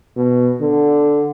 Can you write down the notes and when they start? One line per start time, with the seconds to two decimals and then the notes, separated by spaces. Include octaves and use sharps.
0.17 B2
0.61 D3